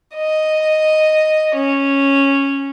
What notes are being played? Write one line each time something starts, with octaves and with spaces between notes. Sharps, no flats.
D#5
C#4